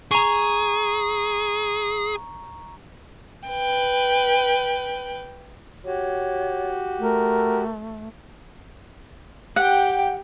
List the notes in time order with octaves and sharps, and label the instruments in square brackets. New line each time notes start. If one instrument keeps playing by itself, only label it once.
[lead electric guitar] G#4 [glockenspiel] A#5 C#6
[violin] B4 G5
[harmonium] F#4 G4 [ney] C#5
[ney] A3 [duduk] A#4
[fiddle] G4 G5 [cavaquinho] F#5